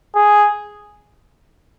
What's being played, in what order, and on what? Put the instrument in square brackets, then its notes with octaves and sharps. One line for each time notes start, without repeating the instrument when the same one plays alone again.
[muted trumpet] G#4